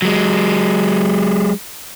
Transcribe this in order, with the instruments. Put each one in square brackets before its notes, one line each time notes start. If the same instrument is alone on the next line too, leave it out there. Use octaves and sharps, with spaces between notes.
[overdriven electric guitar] F#3 G#3